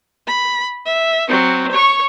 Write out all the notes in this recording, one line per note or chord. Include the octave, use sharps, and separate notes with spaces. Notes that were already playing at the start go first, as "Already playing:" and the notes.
B5
E5
F#3 C4
C#5 C#6